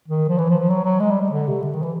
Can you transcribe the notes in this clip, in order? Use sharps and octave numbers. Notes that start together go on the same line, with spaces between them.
D#3
F3
E3
F3
F3
F#3
F#3
G#3
G3
G3
D3
C3
D3
D#3
E3